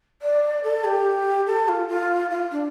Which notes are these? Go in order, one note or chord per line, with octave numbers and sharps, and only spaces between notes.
D5
A4
G4
A4
F4
F4
F4
D4